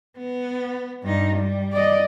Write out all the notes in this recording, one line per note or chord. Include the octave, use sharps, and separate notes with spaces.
B3
G2 D#4
G3
D5 D#5